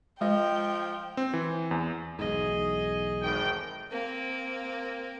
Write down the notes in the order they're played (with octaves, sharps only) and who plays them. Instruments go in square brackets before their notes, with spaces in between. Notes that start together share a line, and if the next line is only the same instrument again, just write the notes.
[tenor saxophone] F3 [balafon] G#3 [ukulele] D#5 [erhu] G5
[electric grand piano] C4
E3
E2
[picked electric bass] B1 E2 G#2 [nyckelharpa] G#4 D#5
[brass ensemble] G#1 A2 G5
[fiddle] A#3 C4